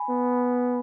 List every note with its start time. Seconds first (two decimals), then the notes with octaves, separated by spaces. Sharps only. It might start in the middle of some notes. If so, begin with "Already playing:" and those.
Already playing: G#5 B5
0.09 B3